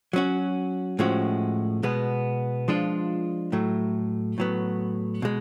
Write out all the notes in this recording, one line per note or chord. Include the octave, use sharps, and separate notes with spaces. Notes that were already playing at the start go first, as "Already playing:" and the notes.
F#3 C#4 F#4
A2 F3 G#3 C#4 F#4
B2 G#3 B3
F3 G#3 D4 F4
A2 F#3 A3
A2 F#3 B3
B2 G#3